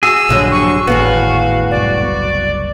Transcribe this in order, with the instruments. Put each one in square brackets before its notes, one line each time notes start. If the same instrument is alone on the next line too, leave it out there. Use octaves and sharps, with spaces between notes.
[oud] F#4 [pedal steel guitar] G#4 [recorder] E6
[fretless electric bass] A#1 [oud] G2 D3 F#3
[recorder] C#6
[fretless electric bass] G#1 [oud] E2 A2 B3 [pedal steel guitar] F#4 [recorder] F5
[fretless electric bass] F#1 C2 [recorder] D5